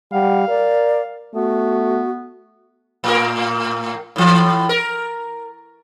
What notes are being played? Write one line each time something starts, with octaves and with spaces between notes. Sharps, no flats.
G3 F5 F#5
A#4 D5
A3 B3 F#4
A2 A#4
A2 E3
A#4